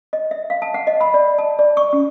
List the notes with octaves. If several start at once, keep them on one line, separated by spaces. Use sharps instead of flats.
D#5
E5
F5
A5
F#5
D#5
B5
D5
A5
D5
C#6
C#4